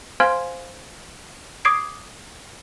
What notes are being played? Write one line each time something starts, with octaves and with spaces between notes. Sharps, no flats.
C5 F5 G#5 C6 F6 G#6
D6 D#6 G#6 C7 D7